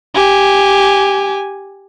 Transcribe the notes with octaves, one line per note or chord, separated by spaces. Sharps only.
G4 G#5